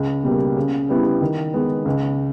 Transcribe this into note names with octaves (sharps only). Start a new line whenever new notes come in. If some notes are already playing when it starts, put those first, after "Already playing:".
Already playing: C#2
B2 G3 A#3
C#3
G3 B3 E4
D#3
G#3 B3
C#2